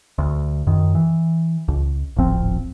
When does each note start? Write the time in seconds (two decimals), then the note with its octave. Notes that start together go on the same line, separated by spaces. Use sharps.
0.18 D2
0.67 F#2 D#3
0.95 E3
1.68 C#2
2.16 D1 G#1 F3 C4